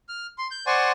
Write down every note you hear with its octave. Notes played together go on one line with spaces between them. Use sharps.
F6
C6
G6
C5 D5 F#5 G#5 C6 C#6